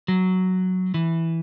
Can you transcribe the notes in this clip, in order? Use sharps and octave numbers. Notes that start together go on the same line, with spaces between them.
F#3
E3